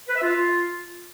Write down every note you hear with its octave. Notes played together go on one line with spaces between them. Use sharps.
B4
E5
F4